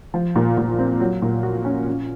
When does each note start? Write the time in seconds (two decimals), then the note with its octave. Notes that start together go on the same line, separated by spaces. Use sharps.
0.14 F3
0.36 A#2
0.57 A#2
0.79 C4
1.00 F#3
1.22 A#2
1.43 F#4
1.65 C#4
1.87 C#4